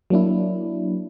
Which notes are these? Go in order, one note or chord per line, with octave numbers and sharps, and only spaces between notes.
F#3 A#3 D4 E4